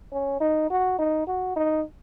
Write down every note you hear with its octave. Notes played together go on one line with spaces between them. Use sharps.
C#4
D#4
F#4
D#4
F#4
D#4